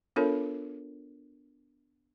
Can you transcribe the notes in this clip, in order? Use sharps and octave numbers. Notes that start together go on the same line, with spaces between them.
B3 D4 F4 A4 A#4 C#5